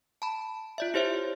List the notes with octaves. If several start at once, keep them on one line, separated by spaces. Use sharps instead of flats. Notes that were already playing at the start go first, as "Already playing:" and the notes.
A5 B5
F4 D5 E5
E4 G4 C5 C#5 E5